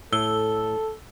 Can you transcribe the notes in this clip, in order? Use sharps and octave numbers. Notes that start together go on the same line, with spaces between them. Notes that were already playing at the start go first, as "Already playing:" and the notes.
A2 A4 E6 G7